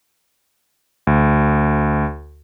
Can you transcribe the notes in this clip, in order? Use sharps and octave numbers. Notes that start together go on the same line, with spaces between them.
D2